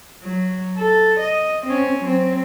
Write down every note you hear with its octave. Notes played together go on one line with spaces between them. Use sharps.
F#3
A4
D#5
C4 C#4
F#3 C4